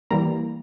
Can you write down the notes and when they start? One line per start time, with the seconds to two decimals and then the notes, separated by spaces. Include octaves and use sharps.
0.11 E3 G3 A#3 A#5